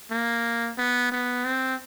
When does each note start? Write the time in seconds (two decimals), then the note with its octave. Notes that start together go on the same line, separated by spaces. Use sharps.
0.11 A#3
0.78 B3
1.12 B3
1.45 C4